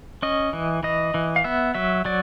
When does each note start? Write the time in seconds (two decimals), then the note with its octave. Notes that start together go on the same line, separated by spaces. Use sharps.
0.22 C#4 D#5
0.53 E3
0.83 E3 D#5
1.14 E3
1.36 F5
1.44 B3 E5
1.75 F#3 E5
2.05 F#3 D5